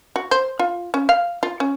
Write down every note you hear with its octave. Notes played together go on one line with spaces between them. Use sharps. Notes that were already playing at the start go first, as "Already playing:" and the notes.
F#4
C5
F4
C#4
F5
F4
C#4